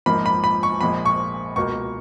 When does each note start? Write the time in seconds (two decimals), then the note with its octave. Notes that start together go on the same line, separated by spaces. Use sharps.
0.06 A#1 G#2 F3 A#3 B5
0.26 B5
0.44 B5
0.63 C#6
0.81 A#1 A#2 F3 G#3 B5
1.05 C#6
1.56 C#2 B2 A#3 C#6